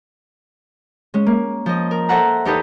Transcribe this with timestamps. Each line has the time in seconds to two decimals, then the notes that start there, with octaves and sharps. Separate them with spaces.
1.14 G#3 C#4
1.26 A#3
1.66 F3 D#5
1.91 A#4
2.09 A4 C5 E5 F#5 A#5
2.45 E2 D#4 G4 A4 B4 D#5